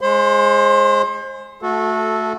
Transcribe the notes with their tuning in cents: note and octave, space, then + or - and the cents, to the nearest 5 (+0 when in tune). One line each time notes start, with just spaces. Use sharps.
G#3 +0 C5 +30 C6 -40
A3 +0 F#4 -25 A4 -15